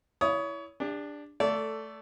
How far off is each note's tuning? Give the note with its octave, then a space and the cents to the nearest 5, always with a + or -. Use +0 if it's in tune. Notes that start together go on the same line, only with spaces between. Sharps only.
E4 +0 C#5 +30 D#6 +10
D4 +0 G4 +45
A3 +0 A4 +10 D5 -25